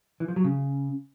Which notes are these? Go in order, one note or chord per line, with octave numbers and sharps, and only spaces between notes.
E3
F3
F#3
C#3